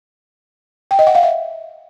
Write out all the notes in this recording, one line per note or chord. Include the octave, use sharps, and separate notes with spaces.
G5
D#5
F#5
F5
E5